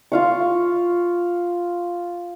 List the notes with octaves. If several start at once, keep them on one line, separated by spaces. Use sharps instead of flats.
F4 F5 C#6